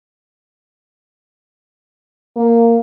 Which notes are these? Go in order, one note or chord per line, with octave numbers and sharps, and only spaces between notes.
A#3